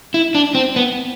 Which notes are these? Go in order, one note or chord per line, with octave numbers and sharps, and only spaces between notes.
E4
D4
C4
B3